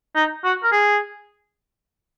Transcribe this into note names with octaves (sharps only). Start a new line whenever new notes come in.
D#4
F#4
A#4
G#4